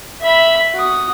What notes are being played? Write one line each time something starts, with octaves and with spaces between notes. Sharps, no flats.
E5 B5
F#4 D#6